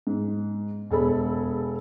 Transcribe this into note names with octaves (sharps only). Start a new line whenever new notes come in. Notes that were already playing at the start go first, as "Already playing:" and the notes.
G#2
E1 G#4 A4 B5